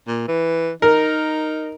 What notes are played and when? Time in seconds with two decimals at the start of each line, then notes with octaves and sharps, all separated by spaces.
0.08 A#2
0.28 E3
0.82 D#4 A#4